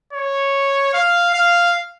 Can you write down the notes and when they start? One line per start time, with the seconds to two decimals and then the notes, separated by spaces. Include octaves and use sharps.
0.13 C#5
0.94 F5
1.34 F5